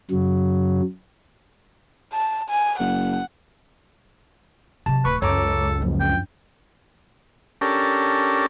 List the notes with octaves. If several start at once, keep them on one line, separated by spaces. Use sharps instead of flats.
F#2 C#3 F#3
A5
G#5
F#1 F#5
C3 F#3 A5
D1 B4 C#6
C#2 F#2 A4 C#5 A#5 D6
F#2 F3 A#3
D4 G5
C#4 D4 G4 A4 A#4